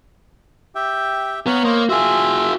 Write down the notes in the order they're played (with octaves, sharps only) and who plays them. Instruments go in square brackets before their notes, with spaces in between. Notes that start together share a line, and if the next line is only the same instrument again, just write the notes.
[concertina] G4 E5 G5
[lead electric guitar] B3 [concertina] C#5 F5 A#5
[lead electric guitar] A#3 [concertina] C5 C#5 D#5
[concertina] F4 E5 [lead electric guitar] F#4 G#4